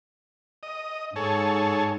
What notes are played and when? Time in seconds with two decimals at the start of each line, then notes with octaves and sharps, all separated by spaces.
0.63 D#5
1.16 G#2 G#4 A4 C#5